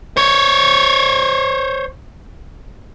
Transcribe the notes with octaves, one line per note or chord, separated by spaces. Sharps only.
C5 C#5